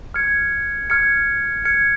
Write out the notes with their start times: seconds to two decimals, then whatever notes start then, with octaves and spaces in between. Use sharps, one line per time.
0.14 F6 G#6 C#7
0.90 F6 G#6 C#7
1.65 F6 G#6 C#7